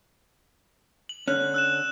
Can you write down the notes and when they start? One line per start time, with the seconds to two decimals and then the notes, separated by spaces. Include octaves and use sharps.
1.09 F#7
1.28 D3 C#4 F#6
1.54 E6 F#6 E7